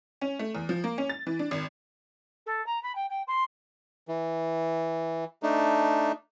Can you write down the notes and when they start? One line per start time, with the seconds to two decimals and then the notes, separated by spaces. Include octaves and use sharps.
0.21 C#4
0.39 A3
0.55 E2
0.69 F3
0.84 A#3
0.98 C#4
1.09 A6
1.27 E3
1.39 D4
1.51 G#1
2.46 A4
2.66 A#5
2.82 B5
2.95 G5
3.09 G5
3.27 C6
4.08 E3
5.43 A3 D4 D#4